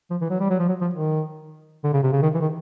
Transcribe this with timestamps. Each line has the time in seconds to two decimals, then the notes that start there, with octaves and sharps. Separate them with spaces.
0.11 F3
0.21 E3
0.30 F#3
0.40 G3
0.50 F#3
0.59 F3
0.69 F#3
0.81 F3
0.94 D#3
1.84 D3
1.93 C#3
2.03 C3
2.12 C#3
2.22 D#3
2.34 E3
2.41 D#3